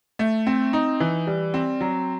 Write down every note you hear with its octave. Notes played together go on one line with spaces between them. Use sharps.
A3
C4
D#4
E3
G3
C4
F#3